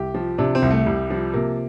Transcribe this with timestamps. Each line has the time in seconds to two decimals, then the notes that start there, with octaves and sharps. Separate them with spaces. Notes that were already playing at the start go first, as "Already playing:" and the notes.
Already playing: C2 G4
0.14 F3
0.38 C3 D4
0.55 C4
0.62 C2
0.70 A3
0.86 C2 G3
1.10 F3 G3
1.34 C3 A#3